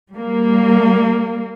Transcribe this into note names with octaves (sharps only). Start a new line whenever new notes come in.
G3 A#3